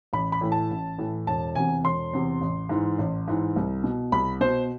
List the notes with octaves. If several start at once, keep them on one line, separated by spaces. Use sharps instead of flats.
A1 B5
B5
A2 E3
A5
A1
A2 E3
E1 A5
E2 C3 G#5
E1 C6
E2 C3
A1
G#2 E3
A1
G#2 E3
C2
B2
C2 B5
B2 C5